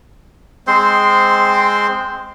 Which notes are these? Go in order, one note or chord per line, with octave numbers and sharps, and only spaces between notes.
G#3 C4 C5 C6